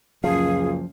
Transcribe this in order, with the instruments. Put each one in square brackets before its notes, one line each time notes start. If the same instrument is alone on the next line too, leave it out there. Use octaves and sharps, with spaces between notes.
[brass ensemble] C#2 F#2 A#2 [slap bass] F3 [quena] G#4 [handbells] F5